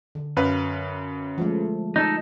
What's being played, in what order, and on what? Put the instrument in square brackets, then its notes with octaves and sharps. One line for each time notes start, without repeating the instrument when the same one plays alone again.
[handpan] D3
[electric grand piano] F#2 B4 F5
[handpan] F3 G#3 A3
[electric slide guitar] D#4 A4